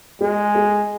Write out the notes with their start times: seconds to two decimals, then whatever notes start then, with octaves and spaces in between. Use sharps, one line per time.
0.21 G#3 G#4
0.55 G#4